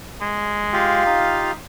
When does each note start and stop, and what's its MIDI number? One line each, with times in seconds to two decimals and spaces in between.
0.21 1.05 56
0.73 1.51 65
0.73 1.51 67
0.73 1.51 77
1.06 1.52 63